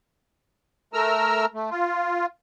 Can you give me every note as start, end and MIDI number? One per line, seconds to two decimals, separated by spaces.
0.94 1.46 57
0.94 1.46 70
0.94 1.46 82
0.94 1.46 88
0.94 1.46 89
1.54 1.70 57
1.71 2.26 65